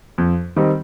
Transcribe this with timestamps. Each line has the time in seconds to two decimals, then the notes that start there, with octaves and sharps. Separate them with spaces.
0.18 F2
0.56 D#3 G3 C4 D#4